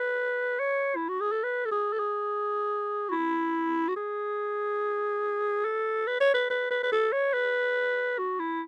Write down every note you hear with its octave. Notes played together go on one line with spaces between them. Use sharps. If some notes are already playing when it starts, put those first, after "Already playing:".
Already playing: B4
C#5
E4
F#4
G#4
A4
B4
A4
G#4
A4
G#4
F#4
E4
F#4
G#4
A4
B4
C#5
B4
B4
B4
B4
A4
C#5
B4
F#4
E4